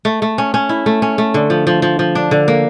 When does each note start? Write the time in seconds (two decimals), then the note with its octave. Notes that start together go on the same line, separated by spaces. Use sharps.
0.05 A3
0.22 A3
0.38 C#4
0.54 C#4
0.69 E4
0.86 A3
1.02 C#4
1.18 A3
1.34 D3
1.50 F3
1.67 F3
1.82 F3
1.99 F3
2.15 D4
2.31 D3
2.48 A#3